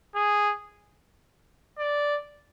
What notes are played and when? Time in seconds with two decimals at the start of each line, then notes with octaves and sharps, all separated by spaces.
0.15 G#4
1.78 D5